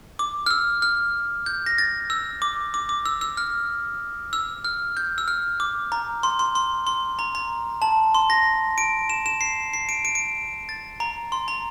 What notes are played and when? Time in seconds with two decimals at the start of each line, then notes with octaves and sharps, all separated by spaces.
0.19 D6
0.46 F6
0.51 E6
0.82 F6
1.46 G6
1.66 A#6
1.78 A6
2.10 E6
2.42 D6
2.74 D6
2.89 D6
3.06 E6
3.21 E6
3.37 F6
4.33 E6
4.65 F6
4.97 G6
5.18 E6
5.28 F6
5.60 D6
5.92 A#5
6.23 C6
6.39 C6
6.55 C6
6.87 C6
7.19 A#5
7.35 A#5
7.82 A5
8.15 C6
8.30 A#6
8.78 D7
9.10 E7
9.26 E7
9.41 C7
9.74 C7
9.89 D7
10.05 D7
10.15 D7
10.69 A6
11.00 A#5
11.32 C6
11.48 A#5